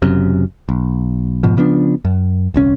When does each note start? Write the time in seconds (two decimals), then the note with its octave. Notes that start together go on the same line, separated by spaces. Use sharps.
0.02 F#1 F#2 C3
0.69 B1
1.43 F1 G#2 B2 F3
1.57 C#3 F3 B3 D4
2.05 F#2
2.54 D#1 C2 C#4